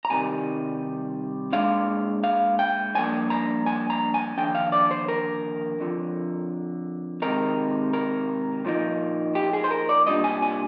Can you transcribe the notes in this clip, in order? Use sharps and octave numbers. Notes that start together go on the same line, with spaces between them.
A#5
C2 C3 D#3 G3 G#5
A#2 G#3 D4 F5
F5
G5
G2 F3 A#3 D4 G#5
A#5
G#5
A#5
G#5
D#2 D3 F3 D4 G5
F5
D5
C5
A#4
F2 D3 F3
C3 D#3 G#3 C4 D#4 A#4
A#4
A#2 F3 A#3 D#4
G4
G#4
C5
A#4
D5
C2 A#2 G3 D4 D#5
G#5
G#5